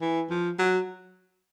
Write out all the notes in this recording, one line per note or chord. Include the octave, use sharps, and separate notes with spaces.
E3
F3
F#3